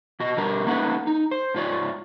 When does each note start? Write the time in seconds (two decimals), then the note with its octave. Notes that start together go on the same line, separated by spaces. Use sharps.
0.20 B2 F#4 D#5
0.37 B2 G3 D4 A#4
0.66 A3 A#3 C#4 D#4 B4 F#5
1.07 D#4
1.31 C5
1.54 G#2 F4 C#5 D5